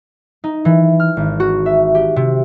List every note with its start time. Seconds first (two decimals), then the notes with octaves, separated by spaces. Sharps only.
0.44 D#4
0.65 E3
1.00 F6
1.17 G#1
1.40 F#4
1.66 E5
1.95 G4
2.16 C3